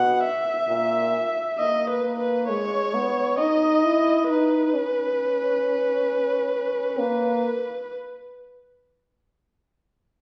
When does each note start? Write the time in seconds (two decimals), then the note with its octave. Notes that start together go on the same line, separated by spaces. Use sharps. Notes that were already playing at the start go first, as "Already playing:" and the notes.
Already playing: B2 F#5
0.24 E5
0.69 A#2
1.59 A#3 D#5
1.90 B4
2.04 A#3
2.19 B4
2.49 G#3 C#5
2.94 B3
3.39 D#4 D#5
3.84 E4
4.29 D#4 B4
4.74 C#4
6.99 A#3 B4